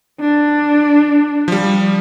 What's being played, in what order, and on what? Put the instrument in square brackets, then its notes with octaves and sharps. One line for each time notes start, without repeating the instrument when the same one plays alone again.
[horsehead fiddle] D4
[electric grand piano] F3 G3